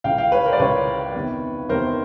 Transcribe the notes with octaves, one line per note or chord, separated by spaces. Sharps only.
C#2 C#3 E3 F5 G5
F5 G5
B4 C#5
A#4 C5
D5
C#2 C#3 E3 B4 C#5
E2 C3 D#3
E2 C3 D#3 A#4 C5